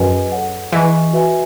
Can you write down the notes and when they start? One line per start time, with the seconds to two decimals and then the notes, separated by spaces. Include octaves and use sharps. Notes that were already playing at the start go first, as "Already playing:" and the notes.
Already playing: F#2 G#4 B4 D#5 G#5
0.32 A4 C#5 F#5
0.72 E3 G#4 D#5 G#5 C#6
1.13 F#4 B4 E5 G#5